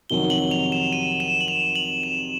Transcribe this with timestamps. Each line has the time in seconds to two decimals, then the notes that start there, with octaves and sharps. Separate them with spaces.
0.10 F2 C3 D#3 F#3 G7
0.30 F#7
0.51 F7
0.72 E7
0.93 D#7
1.20 E7
1.41 F#7
1.48 F7
1.75 F#7
2.03 E7